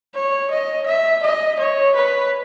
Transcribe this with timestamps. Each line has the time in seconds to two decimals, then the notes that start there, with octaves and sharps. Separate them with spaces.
0.15 C#5
0.50 D#5
0.86 E5
1.23 D#5
1.59 C#5
1.96 B4